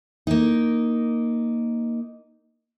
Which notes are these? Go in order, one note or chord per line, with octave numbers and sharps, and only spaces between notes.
A#3 D#4